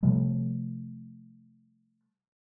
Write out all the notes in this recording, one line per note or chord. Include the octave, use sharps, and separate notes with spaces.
C3 F3 G3 A3